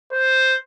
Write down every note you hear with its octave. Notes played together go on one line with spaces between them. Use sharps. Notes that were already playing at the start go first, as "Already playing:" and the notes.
C5